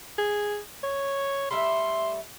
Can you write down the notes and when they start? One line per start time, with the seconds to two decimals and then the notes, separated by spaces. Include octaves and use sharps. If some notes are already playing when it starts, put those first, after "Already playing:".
0.18 G#4
0.83 C#5
1.51 G3 A3 E5 C6